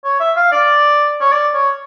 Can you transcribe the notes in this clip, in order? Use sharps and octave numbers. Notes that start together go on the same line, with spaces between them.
C#5
E5
F5
D5
C#5
D5
C#5